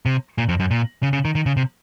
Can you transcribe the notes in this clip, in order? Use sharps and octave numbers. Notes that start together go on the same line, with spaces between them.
C3
A#2
F2
F#2
A#2
C#3
C#3
D#3
D#3
C#3
C3